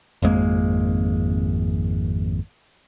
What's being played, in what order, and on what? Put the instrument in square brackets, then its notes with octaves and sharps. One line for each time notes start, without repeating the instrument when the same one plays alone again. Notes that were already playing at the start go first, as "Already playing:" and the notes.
[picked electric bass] G#1 F2 G#3 A#3